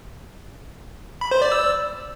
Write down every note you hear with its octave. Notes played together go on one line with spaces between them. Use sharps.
B5
C5
D5
E6